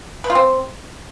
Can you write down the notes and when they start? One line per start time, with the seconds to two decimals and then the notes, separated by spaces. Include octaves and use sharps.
0.24 B4
0.30 F4
0.35 C4